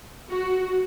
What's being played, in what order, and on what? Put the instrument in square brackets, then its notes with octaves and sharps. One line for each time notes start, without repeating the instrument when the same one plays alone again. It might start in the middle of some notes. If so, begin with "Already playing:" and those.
[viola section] F#4